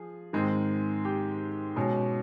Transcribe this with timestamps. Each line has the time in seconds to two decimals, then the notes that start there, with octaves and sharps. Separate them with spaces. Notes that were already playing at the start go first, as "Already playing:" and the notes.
Already playing: F3 G#4
0.33 G#2 D#3 G#3 C4
1.05 G4 G5
1.76 B2 G#3 C#4